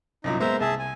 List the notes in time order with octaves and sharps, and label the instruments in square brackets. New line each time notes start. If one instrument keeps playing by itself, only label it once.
[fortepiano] C2 F#2 A#2 [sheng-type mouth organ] D#4
[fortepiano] G#3 A#3 B3 [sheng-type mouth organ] C5 E5 A#5
[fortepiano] C2 [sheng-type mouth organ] G#4 E5 A5
[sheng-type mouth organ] G#5